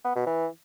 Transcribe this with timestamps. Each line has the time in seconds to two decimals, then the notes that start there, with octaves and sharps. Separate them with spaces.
0.05 B3
0.16 B2
0.26 E3